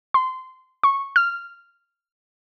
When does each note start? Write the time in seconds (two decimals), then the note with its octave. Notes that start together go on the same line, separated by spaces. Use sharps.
0.14 C6
0.83 C#6
1.16 F6